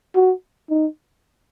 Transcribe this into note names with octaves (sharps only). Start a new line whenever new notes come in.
F#4
D#4